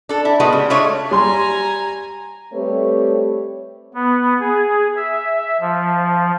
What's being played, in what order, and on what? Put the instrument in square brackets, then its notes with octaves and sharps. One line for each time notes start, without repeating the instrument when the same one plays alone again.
[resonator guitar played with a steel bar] D4 A4
E4
G3 G#3 B3 F#4
C#3
G#3 A3 D4 F4 C#5
[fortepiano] G3 C6 [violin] G#5 A#5
[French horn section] G3 A3 C4 G4 B4 C#5
[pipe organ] B3
G#4
E5
F3